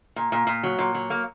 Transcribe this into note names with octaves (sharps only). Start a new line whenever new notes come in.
A#2
A#2
A#2
F#3
A#2
F#3
A#3